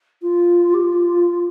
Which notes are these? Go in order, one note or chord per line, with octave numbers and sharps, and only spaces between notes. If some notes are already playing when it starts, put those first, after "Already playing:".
F4
G4
F4